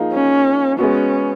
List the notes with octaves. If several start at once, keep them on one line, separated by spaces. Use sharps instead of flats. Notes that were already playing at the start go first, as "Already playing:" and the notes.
Already playing: F3 A#3 D#4 G#4
C#4
G#3 B3 C#4 F#4